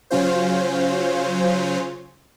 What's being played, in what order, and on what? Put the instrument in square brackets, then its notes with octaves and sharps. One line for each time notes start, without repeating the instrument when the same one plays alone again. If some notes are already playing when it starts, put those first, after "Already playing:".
[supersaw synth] C#3 F#3 C#4 F4 C5